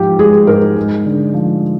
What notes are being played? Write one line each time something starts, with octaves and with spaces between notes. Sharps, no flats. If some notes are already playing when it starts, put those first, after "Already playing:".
Already playing: G#2 F3 G4
G#3 G#4
G#2 A#4
G#3
D3
F3